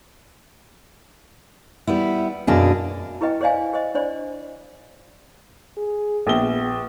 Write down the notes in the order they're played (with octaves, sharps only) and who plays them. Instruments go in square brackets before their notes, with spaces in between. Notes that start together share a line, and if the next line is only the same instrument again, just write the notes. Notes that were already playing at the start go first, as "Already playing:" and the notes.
[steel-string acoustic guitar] G3 B3 E4
F#2 B2 A#3 D4 G#4
[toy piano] E4 G#4 B4 D#5 G5
G#4 C5 D5 D#5 F5 G#5
G#4 C5 D#5
D4 C5 D5
[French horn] G#4
[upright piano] A#1 G7 [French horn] B3